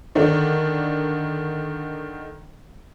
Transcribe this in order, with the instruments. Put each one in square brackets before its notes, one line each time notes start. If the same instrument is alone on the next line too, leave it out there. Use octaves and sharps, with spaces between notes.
[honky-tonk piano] D3 D#3 A3 D4